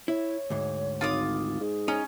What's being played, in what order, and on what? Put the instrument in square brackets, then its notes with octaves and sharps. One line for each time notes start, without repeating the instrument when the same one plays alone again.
[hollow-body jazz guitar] E4 [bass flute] C#5
[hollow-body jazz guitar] D2 G#2
[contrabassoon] G#1 [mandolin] F4 D6 D#6
[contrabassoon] G#2 [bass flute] G#4
[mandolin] C#4 [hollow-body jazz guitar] D#4